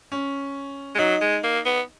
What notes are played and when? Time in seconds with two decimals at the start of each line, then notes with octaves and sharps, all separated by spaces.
0.12 C#4
0.95 G#3
0.99 F#3 D#4
1.21 G#3
1.43 A#3
1.65 B3